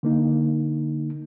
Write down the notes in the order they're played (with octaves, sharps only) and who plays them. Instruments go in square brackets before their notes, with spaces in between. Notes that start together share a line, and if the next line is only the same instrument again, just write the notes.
[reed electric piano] D3 A#3 D#4